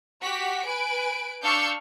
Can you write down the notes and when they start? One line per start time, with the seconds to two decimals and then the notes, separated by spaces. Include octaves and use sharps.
0.22 F#4 G4 B6
0.66 B4 G#5 D7
1.43 D4 F5 C#6 E6 G6 C#7